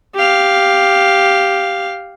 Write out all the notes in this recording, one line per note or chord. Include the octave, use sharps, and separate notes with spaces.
G4 F5